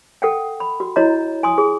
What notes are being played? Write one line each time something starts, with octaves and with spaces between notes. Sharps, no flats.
A4 F#5 G5
B5
F#4
E4 F#4 C#5 D#5 A#5
G#5 C6 D#6
G#4